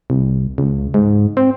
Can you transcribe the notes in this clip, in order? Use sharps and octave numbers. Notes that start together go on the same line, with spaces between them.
C2
C#2
G#2
C4